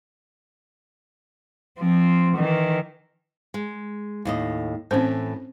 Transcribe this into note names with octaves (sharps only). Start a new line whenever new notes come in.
F3 C4
D#3 E3
G#3
D#2 A2 D#5
A2 E3 C4 C#4 C5